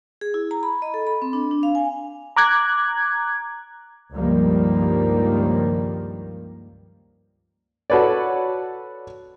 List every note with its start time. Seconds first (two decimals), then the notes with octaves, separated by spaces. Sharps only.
0.21 G#4
0.34 E4
0.51 A#5
0.63 B5
0.82 D#5
0.94 A4
1.07 B5
1.22 C4
1.33 D4
1.51 D4
1.63 F5
1.75 G#5
2.36 A#5 D6 F#6 G#6
4.13 C#2 G2 D#3 F3 G3 A#3
7.90 F#4 A4 B4 C#5 D5